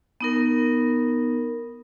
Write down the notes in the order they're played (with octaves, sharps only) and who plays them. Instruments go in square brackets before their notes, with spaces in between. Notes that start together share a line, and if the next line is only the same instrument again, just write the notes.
[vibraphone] B3 D#4 A#4